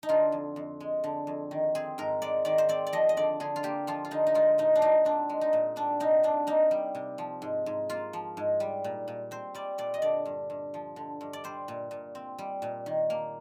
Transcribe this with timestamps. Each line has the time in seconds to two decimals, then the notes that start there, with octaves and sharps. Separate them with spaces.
0.03 D#4
0.09 D3 F4
0.32 F2
0.56 F2
0.80 G#3
1.04 D3
1.27 F2
1.51 D#3
1.75 C4 G#4
1.98 G#2 A#4
2.22 G#3 D5
2.45 D#3 D5
2.58 C5
2.69 C4 D5
2.87 D5
2.93 F3 D#5
3.09 D#5
3.17 D3 D5
3.40 D3 G#4
3.56 F4
3.63 A#3 G4
3.87 F3 F4
4.05 F4
4.11 D3 D#4
4.27 D#4
4.34 G#3 F4
4.58 A#2 D#4
4.76 D4
4.82 A#2 D#4
5.05 C4 D4
5.29 G#3
5.41 D#4
5.53 A#2
5.76 G3 D4
6.00 C3 D#4
6.23 C3 D4
6.47 A#3 D#4
6.71 G3
6.95 C3
7.18 F3
7.42 G#2
7.66 G#2
7.89 A#3 F4
8.13 F3
8.37 G#2
8.60 G3
8.84 A#2
9.08 A#2
9.31 C4 C5
9.54 G3 D5
9.78 A#2 D5
9.94 D#5
10.02 D3 D5
10.25 G2
10.50 G2
10.74 F3
10.96 D3
11.21 G2
11.33 D5
11.44 G3 C5
11.68 A#2
11.91 A#2
12.15 C4
12.38 G3
12.62 A#2
12.86 D#3
13.10 A#3